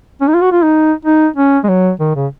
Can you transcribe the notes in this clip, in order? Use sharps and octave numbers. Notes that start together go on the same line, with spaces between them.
C#4
D#4
F4
F#4
F4
D#4
D#4
C#4
G#3
F#3
D#3
C#3